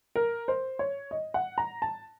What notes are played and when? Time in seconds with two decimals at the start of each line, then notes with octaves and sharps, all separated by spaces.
0.16 A#4
0.48 C5
0.79 C#5
1.11 D#5
1.34 F#5
1.58 A#5
1.82 A5